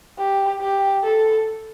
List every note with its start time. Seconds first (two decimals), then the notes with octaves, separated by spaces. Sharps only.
0.19 G4
0.61 G4
1.04 A4